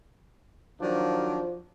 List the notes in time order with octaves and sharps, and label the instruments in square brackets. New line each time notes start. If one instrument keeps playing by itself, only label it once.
[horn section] D#3 F#3 D4 [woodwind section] F3